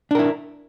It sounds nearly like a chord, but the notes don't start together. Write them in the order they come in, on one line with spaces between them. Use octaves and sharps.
D4 A#4 E4